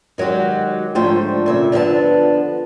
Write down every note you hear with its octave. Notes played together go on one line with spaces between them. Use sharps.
D#3 F#3 G#3 F#4 G4
G#2 D3 F3 A3 C5 G5
A#2 C#3 E5
D3 F3 B3 E5 A5